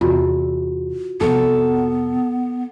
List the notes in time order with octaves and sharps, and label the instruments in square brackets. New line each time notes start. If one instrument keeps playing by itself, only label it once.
[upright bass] E2 C3 [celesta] F4 F#4
[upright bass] F2 C3 [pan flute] B3 [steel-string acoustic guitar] A4